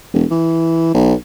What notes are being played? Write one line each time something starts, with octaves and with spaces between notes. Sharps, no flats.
E1
E3
B1